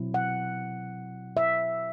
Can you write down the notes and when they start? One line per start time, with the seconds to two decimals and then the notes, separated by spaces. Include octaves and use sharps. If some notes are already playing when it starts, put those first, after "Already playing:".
Already playing: B2 F#3 C4 E4
0.14 F#5
1.37 E5